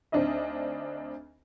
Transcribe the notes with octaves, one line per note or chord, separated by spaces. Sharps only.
D2 C4 D4 D#4 D#5 E5